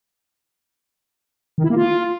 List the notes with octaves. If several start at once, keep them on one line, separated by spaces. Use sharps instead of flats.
D#3
E4
A#3
F4